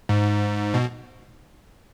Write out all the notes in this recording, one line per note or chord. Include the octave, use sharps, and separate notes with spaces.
G#2
B2